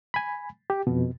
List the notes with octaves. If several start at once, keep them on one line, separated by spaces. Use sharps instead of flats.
G#5 B5
G4
F2 B2